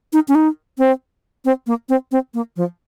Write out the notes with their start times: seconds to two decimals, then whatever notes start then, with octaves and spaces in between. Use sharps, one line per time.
0.13 D#4
0.28 C#4
0.35 D#4
0.78 C4
1.45 C4
1.67 A#3
1.89 C4
2.11 C4
2.34 A#3
2.56 F3